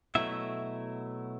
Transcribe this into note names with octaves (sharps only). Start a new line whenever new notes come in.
B2 F#3 A3 E4 E5